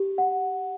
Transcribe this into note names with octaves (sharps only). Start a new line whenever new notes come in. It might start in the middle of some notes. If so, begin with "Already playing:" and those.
Already playing: G4
F#5